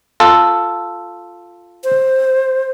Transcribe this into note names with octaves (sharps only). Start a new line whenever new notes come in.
F4 A4
C5